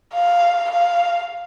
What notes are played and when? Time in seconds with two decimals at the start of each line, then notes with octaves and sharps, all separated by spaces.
0.14 F5
0.71 F5